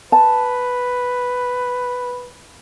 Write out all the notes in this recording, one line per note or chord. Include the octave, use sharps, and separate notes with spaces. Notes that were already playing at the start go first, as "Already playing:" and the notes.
B4 A5